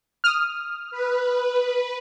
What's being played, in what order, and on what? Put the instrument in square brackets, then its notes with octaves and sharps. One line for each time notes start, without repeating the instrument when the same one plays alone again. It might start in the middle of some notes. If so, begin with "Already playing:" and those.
[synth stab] D#6 F6
[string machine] B4